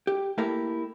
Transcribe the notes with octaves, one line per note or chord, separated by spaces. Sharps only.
G4
A3 A#3 E4 G4 A4 A#4